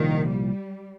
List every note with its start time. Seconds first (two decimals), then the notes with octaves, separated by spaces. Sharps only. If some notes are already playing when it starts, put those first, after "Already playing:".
Already playing: C2 A#2 D#3 F3
0.28 G3